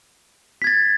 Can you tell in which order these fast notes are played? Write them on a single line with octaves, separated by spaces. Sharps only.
B6 G#6 A6